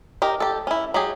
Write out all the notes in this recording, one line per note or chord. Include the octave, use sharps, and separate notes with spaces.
D#4 G4 A#4
G4 A4
C#4 E4
F#3 G4 G#4